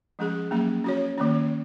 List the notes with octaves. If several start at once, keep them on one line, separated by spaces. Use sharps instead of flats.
F3 G#3 C#4 G#4
F#3 A#3 C#4
C#4 F#4 C#5
D#3 A#3 C#4